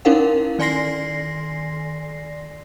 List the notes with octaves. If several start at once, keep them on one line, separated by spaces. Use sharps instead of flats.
C#4 D#4 E4 A#4 F5 F#5
D#3 D5 G#5 C6 A#6 C7